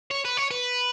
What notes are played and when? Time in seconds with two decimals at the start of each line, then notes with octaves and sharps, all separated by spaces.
0.11 C#5
0.25 B4
0.37 C#5
0.51 B4